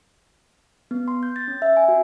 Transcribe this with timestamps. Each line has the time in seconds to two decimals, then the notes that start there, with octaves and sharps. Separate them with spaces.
0.91 B3
1.08 C6
1.23 G6
1.36 A6
1.48 C#4
1.62 E5
1.77 G#5
1.88 F#4